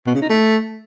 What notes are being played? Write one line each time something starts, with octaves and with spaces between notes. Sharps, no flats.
B2
C#3
D#4
A3